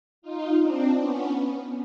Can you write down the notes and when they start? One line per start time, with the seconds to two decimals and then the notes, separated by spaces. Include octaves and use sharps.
0.22 D#4 F4
0.60 C4 D4
0.99 B3 C#4